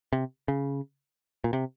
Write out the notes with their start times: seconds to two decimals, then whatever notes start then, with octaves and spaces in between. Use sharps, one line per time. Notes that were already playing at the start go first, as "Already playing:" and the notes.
0.13 C3
0.48 C#3
1.44 A#2
1.53 C3